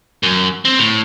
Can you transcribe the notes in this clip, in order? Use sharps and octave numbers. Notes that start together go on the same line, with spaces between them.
F#2
C4
A2